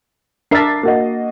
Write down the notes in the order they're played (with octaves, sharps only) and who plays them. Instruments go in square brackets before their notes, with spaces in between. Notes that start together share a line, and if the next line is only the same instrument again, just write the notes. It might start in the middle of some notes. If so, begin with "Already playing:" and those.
[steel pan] D4 A#4 E5 [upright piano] A6 C7
[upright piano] A#3 F#4 D#5